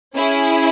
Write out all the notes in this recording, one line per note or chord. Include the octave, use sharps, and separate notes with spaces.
C#4 E4 G#4